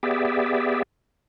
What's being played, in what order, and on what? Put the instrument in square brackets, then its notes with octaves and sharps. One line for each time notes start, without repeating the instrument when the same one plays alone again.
[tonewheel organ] B3 G4 G#4 D5 E5